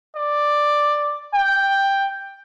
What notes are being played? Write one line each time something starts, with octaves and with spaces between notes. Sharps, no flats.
D5
G5